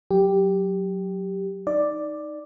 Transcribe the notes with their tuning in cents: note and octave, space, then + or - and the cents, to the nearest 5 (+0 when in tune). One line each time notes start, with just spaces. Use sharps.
F#3 +0 G4 +0
D#4 +0 D5 +5